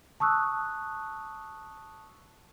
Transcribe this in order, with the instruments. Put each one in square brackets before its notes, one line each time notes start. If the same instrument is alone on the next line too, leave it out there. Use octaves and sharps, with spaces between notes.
[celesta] A5 C#6 D#6 E6 F#6